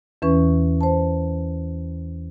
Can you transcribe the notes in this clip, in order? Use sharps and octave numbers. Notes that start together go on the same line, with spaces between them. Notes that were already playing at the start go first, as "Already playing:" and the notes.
E2 E3 C#4 B4 C#6
C5 A5